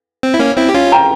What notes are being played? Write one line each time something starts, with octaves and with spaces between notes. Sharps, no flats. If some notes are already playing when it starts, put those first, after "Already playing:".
C4
E4
A#3 C#4
C4 E4
G4
C#4 F4
G5 A#5